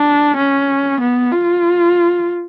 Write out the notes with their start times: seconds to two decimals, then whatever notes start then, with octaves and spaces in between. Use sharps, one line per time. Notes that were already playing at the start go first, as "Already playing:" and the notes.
Already playing: D4
0.37 C#4
1.00 B3
1.32 F4